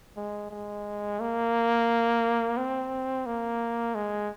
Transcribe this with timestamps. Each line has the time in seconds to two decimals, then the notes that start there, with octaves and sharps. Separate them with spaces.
0.17 G#3
0.51 G#3
1.20 A#3
2.57 C4
3.26 A#3
3.95 G#3